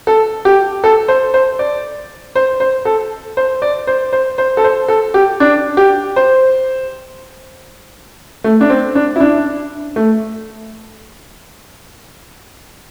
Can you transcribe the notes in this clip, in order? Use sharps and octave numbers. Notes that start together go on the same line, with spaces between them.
A4
G4
A4
C5
C5
D5
C5
C5
A4
C5
D5
C5
C5
C5
A4
C5
A4
G4
D4
G4
C5
A3
D4
C4
D4
E4
D4
A3